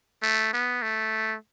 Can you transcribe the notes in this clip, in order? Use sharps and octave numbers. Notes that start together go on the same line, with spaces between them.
A3
B3
A3